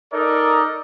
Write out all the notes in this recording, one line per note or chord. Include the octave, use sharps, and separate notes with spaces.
D#4 A4 A#4 D5 D#5